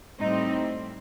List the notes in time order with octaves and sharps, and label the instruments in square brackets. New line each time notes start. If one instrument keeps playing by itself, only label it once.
[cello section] A2 G3 C4 D#4